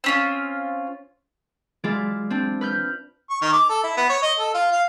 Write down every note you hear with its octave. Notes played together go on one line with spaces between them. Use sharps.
C4 C#4 F4
E3 F#3 G#3 E4 F4 D5
C4 D4
B4 F6 G6
C#6
D#3
D6
A4
E4
B3
C#5
D#5
A4
F4
F5